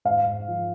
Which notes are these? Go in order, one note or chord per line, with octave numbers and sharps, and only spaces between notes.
G#2 F5
G#2
F3